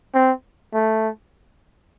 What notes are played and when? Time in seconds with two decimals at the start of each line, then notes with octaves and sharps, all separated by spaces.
0.14 C4
0.74 A3